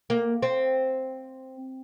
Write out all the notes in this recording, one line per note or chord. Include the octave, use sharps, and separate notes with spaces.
A#3
C4